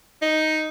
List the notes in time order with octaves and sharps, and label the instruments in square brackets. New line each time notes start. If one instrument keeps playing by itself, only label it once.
[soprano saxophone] D#4